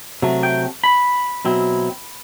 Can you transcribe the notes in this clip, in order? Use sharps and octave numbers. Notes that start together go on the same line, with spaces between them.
C3 F#3 A3
G5
B5
B2 F#3 C4 E4